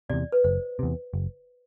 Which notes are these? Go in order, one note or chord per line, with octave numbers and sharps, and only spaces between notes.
E2 C3 D5
B4
F#1 C5
E2 C3
F#1